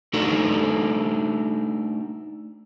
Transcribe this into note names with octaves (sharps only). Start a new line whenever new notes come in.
A3 D4 D#4 F#4 A4